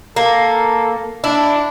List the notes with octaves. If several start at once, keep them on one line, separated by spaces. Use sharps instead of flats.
A#3 A4
D4 E4